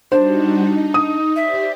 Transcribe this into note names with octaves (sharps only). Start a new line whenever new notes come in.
G3 D4 D#4 F#4 C5
D#4
D#6
G4 C5 D5 E5